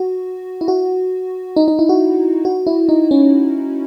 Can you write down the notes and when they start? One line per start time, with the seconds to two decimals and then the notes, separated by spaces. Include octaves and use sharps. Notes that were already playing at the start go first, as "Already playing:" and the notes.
Already playing: F#4
0.61 E4
0.68 F#4
1.56 D#4
1.68 D#4
1.79 E4
1.89 F#4
2.45 F#4
2.67 E4
2.89 D#4
3.11 C#4